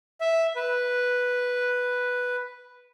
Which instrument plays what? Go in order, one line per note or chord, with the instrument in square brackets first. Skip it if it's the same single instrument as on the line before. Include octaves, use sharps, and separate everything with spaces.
[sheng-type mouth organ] E5
B4